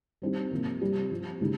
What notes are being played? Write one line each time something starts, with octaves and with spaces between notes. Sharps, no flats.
G3 C4 D#4 G4
C3 F3 A#3
G3 C4 G4
F3 C4 F4
C#3 G#3 D#4 G4